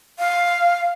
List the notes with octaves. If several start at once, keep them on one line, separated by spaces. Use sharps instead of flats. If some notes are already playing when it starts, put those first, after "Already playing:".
F5